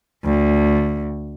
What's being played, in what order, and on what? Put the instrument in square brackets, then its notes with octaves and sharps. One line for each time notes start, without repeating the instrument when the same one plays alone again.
[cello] D2